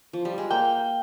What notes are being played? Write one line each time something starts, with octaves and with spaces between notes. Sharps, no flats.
F3
G3
G#3
A#3 G5